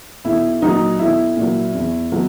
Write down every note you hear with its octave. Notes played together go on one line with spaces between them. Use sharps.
B1 E4
A#2 F#3 D#4
B1 E4
A#2
F#3
E2
B2 F#3